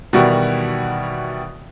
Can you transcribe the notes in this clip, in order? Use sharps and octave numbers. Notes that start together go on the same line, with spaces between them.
B2 D#3 E3 G3 E4 F#4